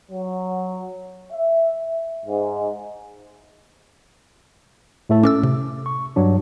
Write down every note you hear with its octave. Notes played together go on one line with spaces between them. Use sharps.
F#3
E5
G#2
A2 A3 A4
C#4 A4 D6 E6
C3
C#6
G2 F#3 D4